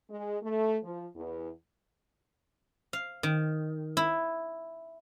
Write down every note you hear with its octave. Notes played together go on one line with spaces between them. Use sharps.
G#3
A3
F3
E2
F5
D#3
E4